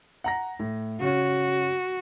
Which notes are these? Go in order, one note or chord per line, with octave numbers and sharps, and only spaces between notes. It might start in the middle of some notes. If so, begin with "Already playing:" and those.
F#5 A#5 A#6
A2
C#3 C#4 F#4